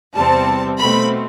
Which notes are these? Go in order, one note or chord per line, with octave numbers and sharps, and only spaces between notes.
E2 C3 G3 C4 A5
B2 A3 C4 B5